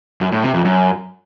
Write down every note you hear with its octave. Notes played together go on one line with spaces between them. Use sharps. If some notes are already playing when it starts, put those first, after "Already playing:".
F#2
A2
C3
F2
F#2